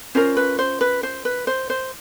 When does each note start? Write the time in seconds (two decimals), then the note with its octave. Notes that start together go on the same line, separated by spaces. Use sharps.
0.15 C#4 F4 A#4 C5
0.37 B4
0.59 C5
0.81 B4
1.03 C5
1.25 B4
1.47 C5
1.70 C5